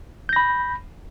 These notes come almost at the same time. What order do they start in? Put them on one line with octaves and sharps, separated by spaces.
G6 A#6 B5